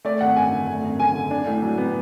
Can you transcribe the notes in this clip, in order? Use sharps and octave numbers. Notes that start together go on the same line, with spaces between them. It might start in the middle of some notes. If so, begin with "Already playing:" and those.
A3 D5
G#1 F#5
F#2 G#5
D3
A3
G#1
F#2 G#5
D3
D4
A2
F#3
B3